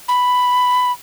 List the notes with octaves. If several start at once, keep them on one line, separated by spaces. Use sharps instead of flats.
B5